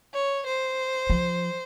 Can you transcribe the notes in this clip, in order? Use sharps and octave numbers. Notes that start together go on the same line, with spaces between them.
C#5
C5
F3